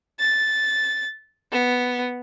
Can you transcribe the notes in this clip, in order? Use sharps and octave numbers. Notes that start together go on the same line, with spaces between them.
A6
B3